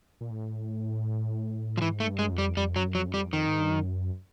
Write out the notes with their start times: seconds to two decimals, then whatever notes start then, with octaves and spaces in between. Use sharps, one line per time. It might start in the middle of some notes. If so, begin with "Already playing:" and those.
0.21 A#2
0.30 A2
1.77 F3
1.81 G#2 E3
2.00 A3
2.07 G2
2.19 G#3
2.28 F#2
2.32 F2
2.38 G3
2.57 F2 G3
2.76 F#2 F#3
2.95 F2 F#3
3.08 F#2
3.14 F2 G3
3.32 F2 D#3
3.47 G#2
3.60 G2
3.71 F#2